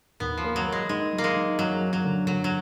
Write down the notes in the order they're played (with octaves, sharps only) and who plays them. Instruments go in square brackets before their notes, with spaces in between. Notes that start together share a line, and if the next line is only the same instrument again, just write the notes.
[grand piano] D#2 [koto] B3
[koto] F3
[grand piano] A#3
[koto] F#3
[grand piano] A#3
[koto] G#3
[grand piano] D#3 [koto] G#3
[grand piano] F#3
[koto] A#3
G#3
[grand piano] D#3
[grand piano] F#2 [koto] F#3
[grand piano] F#2
[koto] F#3
[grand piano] D3
[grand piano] D3 [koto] F#3
[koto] F#3